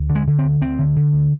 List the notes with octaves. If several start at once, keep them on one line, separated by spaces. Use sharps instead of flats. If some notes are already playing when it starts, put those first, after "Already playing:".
Already playing: D2
D3
G#3
D3
C4
D2
D2 C4
D3
D3
D2